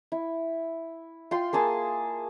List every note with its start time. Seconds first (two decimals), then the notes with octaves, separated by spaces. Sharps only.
0.12 E4
1.31 F4 G5 C6
1.53 A#3 G#4 A5 E6